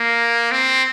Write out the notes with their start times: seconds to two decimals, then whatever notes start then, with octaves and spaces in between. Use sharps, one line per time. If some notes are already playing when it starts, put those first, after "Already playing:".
Already playing: A#3
0.52 C4